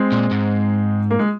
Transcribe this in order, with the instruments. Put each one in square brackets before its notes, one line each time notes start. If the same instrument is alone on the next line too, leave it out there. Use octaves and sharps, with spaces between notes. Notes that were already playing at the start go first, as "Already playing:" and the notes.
Already playing: [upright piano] G#3 C4
[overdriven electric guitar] A#2
G#2
[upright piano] A#3
G#3